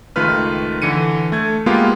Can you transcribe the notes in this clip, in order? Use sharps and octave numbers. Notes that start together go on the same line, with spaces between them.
C#2 D#3 A3 F4 B4 F6
D3 E3 C#7 D#7
A3 G#6
G#3 A#3 B3 F4 G4